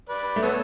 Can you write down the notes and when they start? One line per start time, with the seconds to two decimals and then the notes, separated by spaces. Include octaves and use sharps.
0.09 B4 D5
0.36 A3
0.43 B3 A4 C#5